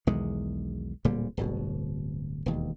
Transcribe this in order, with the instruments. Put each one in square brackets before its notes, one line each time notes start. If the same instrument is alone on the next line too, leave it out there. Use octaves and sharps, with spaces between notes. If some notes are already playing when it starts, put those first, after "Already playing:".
[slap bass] B1 E2 D#3 G#3
D1 A#2 D3 G3
D1 G1 B2
E1 D#2